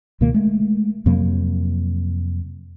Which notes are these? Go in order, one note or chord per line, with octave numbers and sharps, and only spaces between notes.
C#2 B2 D#3 A#3
G#3 A3
F2 C3 F#3 A#3